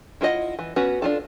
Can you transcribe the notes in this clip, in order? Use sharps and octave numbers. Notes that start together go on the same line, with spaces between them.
E4 F4 B4 D#5 F#5
E3
B3 C#4 F#4 B4
D4 F4 A4